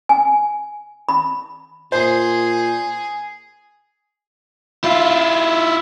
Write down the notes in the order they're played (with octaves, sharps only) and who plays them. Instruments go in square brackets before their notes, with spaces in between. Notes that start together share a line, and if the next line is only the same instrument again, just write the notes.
[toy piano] G#5
B5
[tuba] A#2 [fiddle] G#4 [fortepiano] C5
[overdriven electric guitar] E4 F4